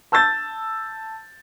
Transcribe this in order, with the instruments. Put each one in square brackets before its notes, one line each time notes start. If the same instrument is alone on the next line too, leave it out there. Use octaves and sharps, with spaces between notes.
[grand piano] A5 E6 G6 A6